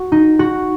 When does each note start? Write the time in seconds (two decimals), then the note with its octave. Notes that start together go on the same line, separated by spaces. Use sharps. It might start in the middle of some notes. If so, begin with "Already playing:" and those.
Already playing: F#4
0.12 D#4
0.39 F#4